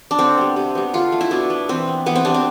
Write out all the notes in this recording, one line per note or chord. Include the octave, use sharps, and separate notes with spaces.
D4
D3 C4
G3 B3
C3
G3 B3
D3 F4
A3
E4
B2 D4
B3
E3 C4
B3
E3 B3
C4
G3 B3 D4
C4